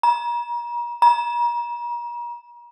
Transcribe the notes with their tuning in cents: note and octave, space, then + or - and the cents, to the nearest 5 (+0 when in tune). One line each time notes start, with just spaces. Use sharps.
A#5 +40
A#5 +40